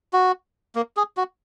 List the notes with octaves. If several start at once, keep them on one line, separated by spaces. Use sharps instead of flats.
F#4
A#3
G#4
F#4